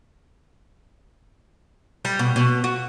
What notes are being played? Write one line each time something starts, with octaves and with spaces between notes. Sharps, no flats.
G3
B2
B2
F#4